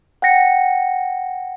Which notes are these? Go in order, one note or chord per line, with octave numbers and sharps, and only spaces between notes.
F#5 G5 A#6 C#7